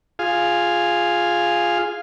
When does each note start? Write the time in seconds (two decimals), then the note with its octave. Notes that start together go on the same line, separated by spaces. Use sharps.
0.19 F4 G#4 F5